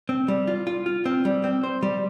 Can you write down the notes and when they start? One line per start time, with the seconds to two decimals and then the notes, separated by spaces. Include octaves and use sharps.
0.09 C4
0.28 G3
0.47 F4
0.67 F4
0.86 F4
1.05 C4
1.25 G3
1.44 C4
1.63 C5
1.83 G3